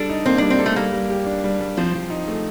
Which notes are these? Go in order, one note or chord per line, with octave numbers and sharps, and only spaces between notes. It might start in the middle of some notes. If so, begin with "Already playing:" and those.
Already playing: G3 D4 A4
D#4
A#3 C4
G3 D4
C4
A4
A3
G3 A#3
G3
G4
D4
G3
G3
F3 C4
F3
D#4
A3